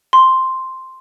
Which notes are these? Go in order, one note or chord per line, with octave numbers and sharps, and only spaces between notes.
C6